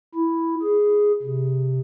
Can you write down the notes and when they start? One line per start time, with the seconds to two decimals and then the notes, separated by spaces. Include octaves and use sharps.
0.15 E4
0.62 G#4
1.23 C3